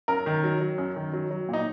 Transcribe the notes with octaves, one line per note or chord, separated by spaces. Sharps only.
F#2 A#4
D#3
F#3
F#3
F#2
D#3
F#3
F#3
A#2
D#4